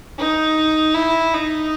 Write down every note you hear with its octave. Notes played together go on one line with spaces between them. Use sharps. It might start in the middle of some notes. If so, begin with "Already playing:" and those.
D#4
E4
D#4